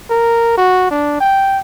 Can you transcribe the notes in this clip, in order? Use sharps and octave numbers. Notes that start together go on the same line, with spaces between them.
A#4
F#4
D4
G5